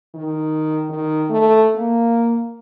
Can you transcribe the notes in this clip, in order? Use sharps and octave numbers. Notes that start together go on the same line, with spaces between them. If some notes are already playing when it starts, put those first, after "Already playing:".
D#3
D#3
A3
A#3